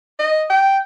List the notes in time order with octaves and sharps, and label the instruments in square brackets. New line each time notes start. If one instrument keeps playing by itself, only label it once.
[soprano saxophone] D#5
G5